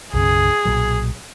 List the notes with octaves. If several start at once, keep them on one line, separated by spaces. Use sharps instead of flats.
B1 F#2 C#3 G#4
B1 A#2 F#3